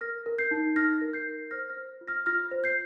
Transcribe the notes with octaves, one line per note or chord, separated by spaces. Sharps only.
A#4 F6 A#6
A#4
G6 C7
D#4
D#4 F6 A#6
A#4
G6 C7
A#4
C5 F6 A#6
F6 A#6
C5
F4
F6 A#6
F4 F6 A#6
C5
G6 C7